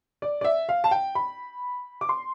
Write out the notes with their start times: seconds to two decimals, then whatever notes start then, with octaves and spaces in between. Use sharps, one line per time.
0.22 D5
0.41 D5
0.44 E5
0.69 F5
0.84 A5
0.91 G5
1.15 B5
2.01 D6
2.09 C6